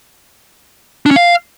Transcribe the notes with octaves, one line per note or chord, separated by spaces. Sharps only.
D4
C#4
F5